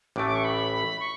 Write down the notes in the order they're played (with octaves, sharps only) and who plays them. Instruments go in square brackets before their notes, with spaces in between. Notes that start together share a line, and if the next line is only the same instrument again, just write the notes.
[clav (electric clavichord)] A1 A2 E3 A3 [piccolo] D6
[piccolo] D6
C#6
B5
B5
C#6